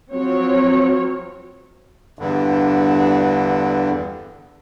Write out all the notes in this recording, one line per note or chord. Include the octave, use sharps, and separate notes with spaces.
F3 F#3 C4 C#5
E2 G2 D3